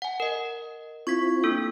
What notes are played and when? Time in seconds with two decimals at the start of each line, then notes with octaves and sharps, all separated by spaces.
0.02 F#5 G#5
0.20 A#4 D#5
1.07 C4 E4 F4 C#6 G#6 B6
1.44 A#3 D4 A4